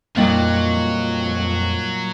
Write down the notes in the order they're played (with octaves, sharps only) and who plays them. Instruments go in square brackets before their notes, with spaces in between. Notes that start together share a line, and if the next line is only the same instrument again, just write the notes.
[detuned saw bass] F2 [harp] A#2 G3 D#4 [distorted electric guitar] F#3